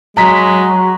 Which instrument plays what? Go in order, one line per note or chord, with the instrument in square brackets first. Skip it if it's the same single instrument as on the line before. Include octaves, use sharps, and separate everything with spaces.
[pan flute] F#3 [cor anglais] G#3 [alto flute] F#4 [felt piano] A#5 B6